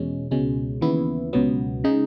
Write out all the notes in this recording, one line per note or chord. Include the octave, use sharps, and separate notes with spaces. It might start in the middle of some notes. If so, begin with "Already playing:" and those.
Already playing: E2 B2 G#3 C#4
C#2 B2 G#3 C#4
D#2 C#3 E3 B3 E4
C#2 B2 F#3 B3
C#3 G#3 D#4